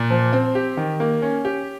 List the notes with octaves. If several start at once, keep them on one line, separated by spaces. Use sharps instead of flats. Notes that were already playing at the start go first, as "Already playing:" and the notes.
Already playing: A#2
F3
C4
G4
D#3
A#3
C#4
G4